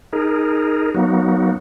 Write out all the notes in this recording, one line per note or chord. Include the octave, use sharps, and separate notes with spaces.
D#4 G#4 A#4
F#3 A#3 B3 D#4 F#4